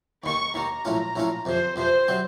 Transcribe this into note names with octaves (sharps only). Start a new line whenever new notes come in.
D#2 D#3 A#3 C#6
D#2 D#3 A#3 A#5
A#1 A2 A3 C#4 F4
A#1 A2 A3 C#4 F4
F2 C3 F3 C5
F2 C3 F3 C5
C3 F#3 C4